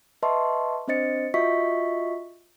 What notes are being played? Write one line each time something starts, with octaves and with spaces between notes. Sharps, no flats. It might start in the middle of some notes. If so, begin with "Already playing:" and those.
B4 D#5 E5 A5 C6 C#6
C4 D4 C5 D#5 A6 C#7
F4 F#4 D#5 E5 C#6 B6